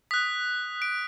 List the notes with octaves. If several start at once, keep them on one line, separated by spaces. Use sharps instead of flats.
D#6 F#6 B6
D7